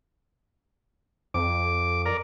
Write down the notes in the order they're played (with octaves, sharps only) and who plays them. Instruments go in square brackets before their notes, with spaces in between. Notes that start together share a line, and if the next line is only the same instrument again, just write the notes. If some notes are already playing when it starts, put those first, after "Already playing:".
[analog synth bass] F2 [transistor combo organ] D6
[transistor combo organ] A#4 D5